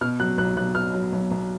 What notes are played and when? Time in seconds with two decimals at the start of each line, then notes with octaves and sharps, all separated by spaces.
0.01 B2 F6
0.20 F#3 F#6
0.38 B1 F#6
0.57 B1 F#6
0.75 B2 F6
0.94 F#3
1.12 B1
1.31 B1